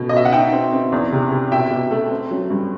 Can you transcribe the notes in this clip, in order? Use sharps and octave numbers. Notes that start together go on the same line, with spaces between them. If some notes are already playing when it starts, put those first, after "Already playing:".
Already playing: B2 A3
D#5
B2 E5
F#5
D#4 E5 G5
C4
C4
E2
C3
C3
B2 E5 G5
B2
A3
C4
F#3
G2